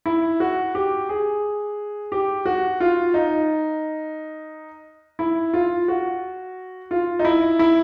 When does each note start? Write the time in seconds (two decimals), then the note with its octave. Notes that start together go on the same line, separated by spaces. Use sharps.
0.06 E4
0.40 F#4
0.75 G4
1.09 G#4
2.12 G4
2.46 F#4
2.80 F4
3.14 D#4
5.19 E4
5.54 F4
5.88 F#4
6.91 F4
7.19 D#4
7.25 E4
7.59 E4